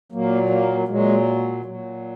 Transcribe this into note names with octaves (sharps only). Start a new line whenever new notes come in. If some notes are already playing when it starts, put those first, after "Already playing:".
A#2 F#3 A#3
A#3
A#2 F#3 G#3
A#2 F#3